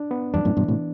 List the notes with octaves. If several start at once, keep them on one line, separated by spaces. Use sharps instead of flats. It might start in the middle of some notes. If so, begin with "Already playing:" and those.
Already playing: D4
B3
E2 G2 D4
F#2 A2
G2 B2 E3
A2 C3